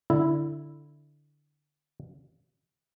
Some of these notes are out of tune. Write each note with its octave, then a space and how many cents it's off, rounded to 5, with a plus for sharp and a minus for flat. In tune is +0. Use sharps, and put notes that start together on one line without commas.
D3 +0 E4 +0